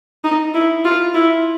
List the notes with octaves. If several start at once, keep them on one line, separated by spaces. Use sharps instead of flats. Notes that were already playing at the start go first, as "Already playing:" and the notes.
D#4
E4
F4
E4